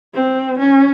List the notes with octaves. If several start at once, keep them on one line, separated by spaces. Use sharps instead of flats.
C4
C#4